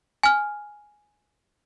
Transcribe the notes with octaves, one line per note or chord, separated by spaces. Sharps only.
G#5 F6